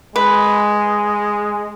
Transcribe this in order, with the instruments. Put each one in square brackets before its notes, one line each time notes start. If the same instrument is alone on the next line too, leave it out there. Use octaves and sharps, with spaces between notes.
[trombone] G#3 [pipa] B4